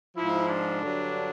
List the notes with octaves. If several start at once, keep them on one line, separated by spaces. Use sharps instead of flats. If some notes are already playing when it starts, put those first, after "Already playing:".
G#2 F3 E4
D4
G2 D3 F#3